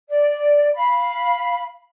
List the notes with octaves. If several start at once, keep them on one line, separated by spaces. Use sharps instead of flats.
D5
F5 B5